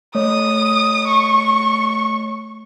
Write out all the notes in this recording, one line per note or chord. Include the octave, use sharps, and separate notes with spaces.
A3 C#5 D#6
C#6